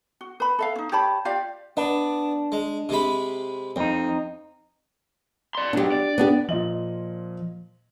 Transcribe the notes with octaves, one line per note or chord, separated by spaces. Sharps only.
F#4
B4 B5
A4 E5 F5
C#4 D#4
G4 C#5 A5 B5
F4 G4 D5 F5
B3 D4
G#3
C3 G#3 B5
F2 C4 D#4
D5 C6
B2 F#3 D4 G4
D5
B3 D4 G4
A#2 F3 D#5 F#7